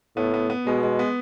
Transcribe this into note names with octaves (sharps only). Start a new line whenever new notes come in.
A2 B3
B3
B3
B2 G#3
G#3
B3